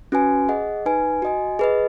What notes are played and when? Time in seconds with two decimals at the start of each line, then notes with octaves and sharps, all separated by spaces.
0.12 C#4 F#4 B4 G#5
0.49 G#4 D#5 F#5
0.86 D#4 B4 G#5
1.22 F#4 D#5 G#5
1.59 G#4 B4 D#5